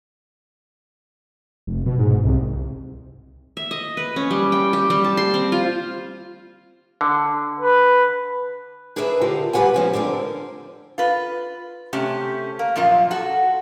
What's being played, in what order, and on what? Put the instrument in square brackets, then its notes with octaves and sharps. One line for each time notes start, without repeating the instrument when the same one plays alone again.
[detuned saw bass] F1
B2
G#2
C2
[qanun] E5
D#5
B4
C#4
G3
G5
G4
G3
A5
C6
C4
F4
[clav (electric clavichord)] D3
[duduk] B4
[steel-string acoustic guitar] D4 G#4 A#4 B4 E5
D3 F4 G4 A#4
G3 G4 B4 F#5 G#5
C#3 F3 C#4
D3 C4 D4 A#4
[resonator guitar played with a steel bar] F4 B4
C3 A3 C#4 G4
A#3
F#2 A#2 F3 F4
F#4 A4